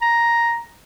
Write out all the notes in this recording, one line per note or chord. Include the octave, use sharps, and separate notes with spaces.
A#5